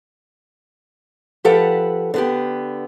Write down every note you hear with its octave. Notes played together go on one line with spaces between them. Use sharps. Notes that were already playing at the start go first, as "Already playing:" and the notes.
F3 G4 A4 B4 F#5
D3 B3 G4